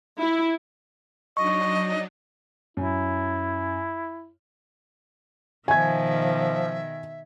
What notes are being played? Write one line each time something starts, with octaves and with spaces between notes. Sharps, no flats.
E4
F#3 D4 D#4 D#5 C#6
F#2 E4
B2 D#3 F3 E5 G#5 G#6